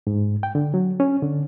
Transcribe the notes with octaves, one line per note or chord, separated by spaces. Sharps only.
G#2
G5
D3
F#3
C#4
D3